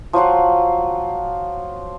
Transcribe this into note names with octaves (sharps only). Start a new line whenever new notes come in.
F3 F#3 F4 F#5